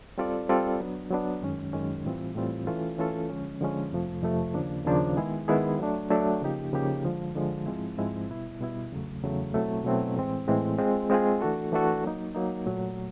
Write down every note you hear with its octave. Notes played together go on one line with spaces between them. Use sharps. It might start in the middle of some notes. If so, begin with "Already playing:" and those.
G3 C4 F4 A4 D5
G3 C4 F4 A4 D5
F#3 B3 D4
F#3 B3 D4
F#2 D#3 G#3 C#4
F#2 D#3 G#3 C#4
A2 E3 G3 C4 F4
A2 E3 G3 C4 F4
E3 A3 C#4 F4 A4
E3 A3 C#4 F4 A4
D3 F3 G#3 C#4
D3 F3 G#3 C#4
F2 C3 F3 A3
F2 C3 F3 A3
D#2 C#3 F3 A#3 D4
D#2 C#3 F3 A#3 D4
D#3 G#3 B3 E4 G#4
D#3 G#3 B3 E4 G#4
F#3 A3 D4
F#3 A3 D4
C#3 F3 A#3 D#4 G4
C#3 F3 A#3 D#4 G4
D3 F3 G#3
D3 F3 G#3
G#2 F3 G#3 C4 E4
G#2 F3 G#3 C4 E4
B2 G3 B3 E4
B2 G3 B3 E4
E2 C#3 F#3 A3
E2 C#3 F#3 A3
B2 F#3 A3 C4 E4
B2 F#3 A3 C4 E4
A2 E3 G#3 C4
A2 E3 G#3 C4
G#3 C4 F4 G#4
G#3 C4 F4 G#4
E3 A3 D4 F#4 A4
E3 A3 D4 F#4 A4
F#3 A#3 D#4
F#3 A#3 D#4
A#2 F#3 A3